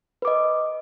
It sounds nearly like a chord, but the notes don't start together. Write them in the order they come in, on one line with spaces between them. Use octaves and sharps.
B4 D6 D#5